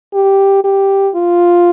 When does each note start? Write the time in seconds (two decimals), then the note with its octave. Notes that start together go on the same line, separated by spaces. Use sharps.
0.14 G4
0.64 G4
1.15 F4